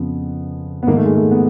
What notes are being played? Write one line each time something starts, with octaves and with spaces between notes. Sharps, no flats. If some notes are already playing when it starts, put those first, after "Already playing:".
Already playing: F2 C#3 F3 B3
B3
G#2 D#3 A#3
A3
G#3
A3
B3